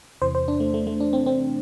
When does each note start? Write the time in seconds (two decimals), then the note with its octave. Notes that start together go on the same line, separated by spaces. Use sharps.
0.22 E2 C3 E3 C5
0.35 C5
0.48 D4
0.60 A3
0.74 A3
0.87 A3
1.00 D4
1.13 C4
1.26 C4